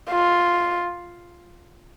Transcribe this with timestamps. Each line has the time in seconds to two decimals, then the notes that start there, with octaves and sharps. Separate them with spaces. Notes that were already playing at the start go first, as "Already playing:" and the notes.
0.11 F4